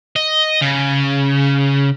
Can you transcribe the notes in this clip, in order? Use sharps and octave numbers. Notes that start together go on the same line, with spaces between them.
D#5
C#3